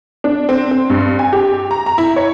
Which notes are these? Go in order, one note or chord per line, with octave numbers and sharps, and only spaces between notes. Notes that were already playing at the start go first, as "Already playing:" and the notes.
D4
C4
C4
G2
G#5
G4
A#5
A#5
E4
C#5